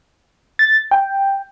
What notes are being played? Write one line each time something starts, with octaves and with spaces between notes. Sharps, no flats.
A6
G5